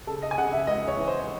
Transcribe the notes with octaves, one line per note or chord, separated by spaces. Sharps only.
C#3 A4
D#5
G#5
C#3 F#5
E5
C#2 D#5
C#5
E3
C5